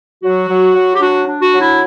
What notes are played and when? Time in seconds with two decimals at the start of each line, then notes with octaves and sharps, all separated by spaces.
0.23 F#3 F#4
0.49 F#3
0.75 F#3
0.95 G4
1.01 D4 F#4
1.28 D4
1.40 F#4
1.54 F#3
1.60 E4